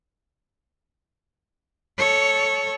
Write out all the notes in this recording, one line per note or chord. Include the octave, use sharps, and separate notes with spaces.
A4 C#5